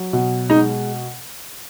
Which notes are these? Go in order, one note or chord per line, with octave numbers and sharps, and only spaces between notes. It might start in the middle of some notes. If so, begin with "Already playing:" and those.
Already playing: F#3
B2
G#3 D#4